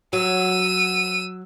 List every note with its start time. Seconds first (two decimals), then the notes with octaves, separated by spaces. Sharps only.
0.13 F#3 E6 D#7